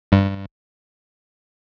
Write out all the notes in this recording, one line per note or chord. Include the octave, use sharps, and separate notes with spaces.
G2